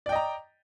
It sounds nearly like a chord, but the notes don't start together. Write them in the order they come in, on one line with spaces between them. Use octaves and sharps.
D5 G5 D#5 A#5